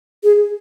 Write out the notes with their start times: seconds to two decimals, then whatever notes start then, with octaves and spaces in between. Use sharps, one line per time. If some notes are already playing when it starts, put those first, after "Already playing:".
0.23 G#4